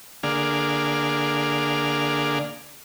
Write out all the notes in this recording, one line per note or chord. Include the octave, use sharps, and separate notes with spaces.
D3 A#3 D4 G#4 F5